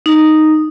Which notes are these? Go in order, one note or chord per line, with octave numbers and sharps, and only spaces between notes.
D#4